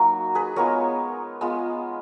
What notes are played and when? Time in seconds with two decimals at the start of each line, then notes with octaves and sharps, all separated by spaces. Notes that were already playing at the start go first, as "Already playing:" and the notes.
Already playing: F#3 A#3 D#4 F#4
0.35 G#4 B4
0.56 G#3 B3 F4 A#4 C#5
1.41 G#3 B3 F4